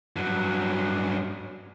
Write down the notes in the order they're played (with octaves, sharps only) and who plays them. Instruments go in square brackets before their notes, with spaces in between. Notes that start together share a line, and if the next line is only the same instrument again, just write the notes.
[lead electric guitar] G2 F#3